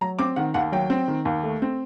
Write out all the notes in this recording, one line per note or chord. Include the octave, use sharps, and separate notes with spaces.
F#3 A#5
C4 D6
D#3 F#5
D#2 F#5
F#3 G5
C4
D#3
D#2
A3
C4